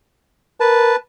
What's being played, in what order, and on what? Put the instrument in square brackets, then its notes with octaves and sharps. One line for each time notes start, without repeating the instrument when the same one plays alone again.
[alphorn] A#4 [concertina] B4 A5